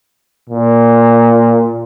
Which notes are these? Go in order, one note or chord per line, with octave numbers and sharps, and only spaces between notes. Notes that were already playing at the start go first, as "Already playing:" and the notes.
A#2